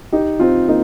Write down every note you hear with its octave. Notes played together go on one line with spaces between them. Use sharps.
D#4 G4
C4 F4
A#3 D#4